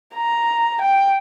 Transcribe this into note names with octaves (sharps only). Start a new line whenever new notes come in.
A#5
G5